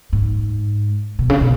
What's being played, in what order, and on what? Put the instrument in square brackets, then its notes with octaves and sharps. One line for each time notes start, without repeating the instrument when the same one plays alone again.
[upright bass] G#2
B2
C#3
B2